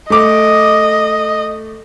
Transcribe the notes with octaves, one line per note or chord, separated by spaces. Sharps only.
A3 D#5 D6